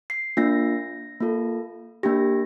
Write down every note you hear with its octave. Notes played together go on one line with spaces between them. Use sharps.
C7
A#3 D4 F4 A#6
A#3 F4 A4
A#3 D4 G4 A#6